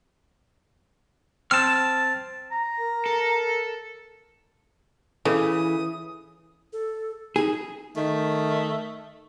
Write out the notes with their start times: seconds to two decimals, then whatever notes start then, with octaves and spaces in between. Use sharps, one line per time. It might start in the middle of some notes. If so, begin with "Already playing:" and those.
1.51 C4 A5 F6
2.51 A#5
2.78 A#4
3.06 A4
5.25 C#3 E3 A4 D#6
6.73 A4
7.36 D#4 G#4
7.96 D#3 A3